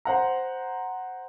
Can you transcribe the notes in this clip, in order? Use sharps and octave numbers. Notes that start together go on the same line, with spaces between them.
C5 F#5 A#5